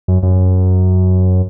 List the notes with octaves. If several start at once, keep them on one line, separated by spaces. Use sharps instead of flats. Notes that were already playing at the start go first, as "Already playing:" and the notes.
F#2
F#2